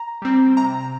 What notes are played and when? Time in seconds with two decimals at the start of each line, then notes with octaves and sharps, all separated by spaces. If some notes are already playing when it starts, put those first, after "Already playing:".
Already playing: A#5
0.22 G3 C4
0.57 C3 A#5